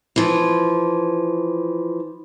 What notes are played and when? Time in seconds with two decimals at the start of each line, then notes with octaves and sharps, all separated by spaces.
0.16 E3 F3